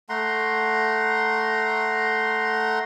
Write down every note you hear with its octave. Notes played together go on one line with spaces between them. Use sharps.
A3 F#5 A#5 C6